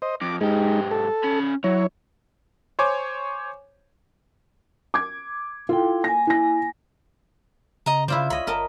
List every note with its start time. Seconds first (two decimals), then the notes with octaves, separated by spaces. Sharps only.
0.02 C5 D#5
0.21 F2 D6
0.41 G#2 G#3 D#4 G4
0.91 A4
1.24 C#4 B5
1.64 F#3 E4 C#5
2.79 C5 C#5 G#5 D6
4.94 D6 G#6
5.69 E4 F4 A4 G5
6.04 A#3 G#5 A#6
6.27 E4 A#6
7.86 C#3 D#5 A#5
8.08 C#3 E4 F4 C5 D5
8.30 C#2 C#5 D#5 B5
8.47 G1 A#4 D#5 A5